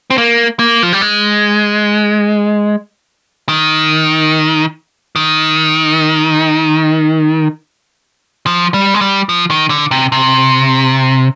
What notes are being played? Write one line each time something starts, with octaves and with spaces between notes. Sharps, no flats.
C4
A#3
A#3
F3
G3
G#3
D#3
D#3
F3
G3
G#3
G3
F3
D#3
D3
C3
C3